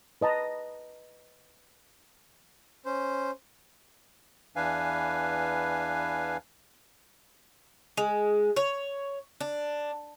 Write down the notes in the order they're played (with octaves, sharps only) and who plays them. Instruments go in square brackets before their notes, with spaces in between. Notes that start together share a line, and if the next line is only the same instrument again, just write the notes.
[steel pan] B4 D#5 A5 A#5
[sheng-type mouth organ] C#4 C5
[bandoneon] E2 E3 D4 B4 F5 G#5
[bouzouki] G#3
C#5
D4